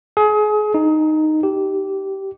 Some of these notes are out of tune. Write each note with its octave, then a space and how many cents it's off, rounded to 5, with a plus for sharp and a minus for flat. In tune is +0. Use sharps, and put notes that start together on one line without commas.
G#4 +30
D#4 -5
G4 -15